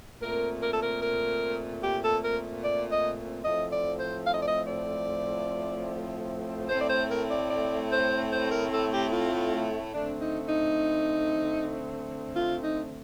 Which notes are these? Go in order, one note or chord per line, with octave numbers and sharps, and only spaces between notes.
A#2 A3 C4 A#4
A#4
A4
A#4
A#4
G4
A4
A#4
D5
D#5
A2 F3 A3 C4 D#5
D5
C5
F5
D#5
D5
D#5
D5
A2 A3 C4 C5
D5
C5
A#4
D5
D5
C5
C5
A#4
A4
G4
F4
D3 A3 C4 D4
D#4
D#4
F4
D#4